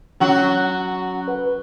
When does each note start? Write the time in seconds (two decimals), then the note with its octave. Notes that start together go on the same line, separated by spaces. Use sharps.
0.20 F#3 C#4 F#4
1.28 B4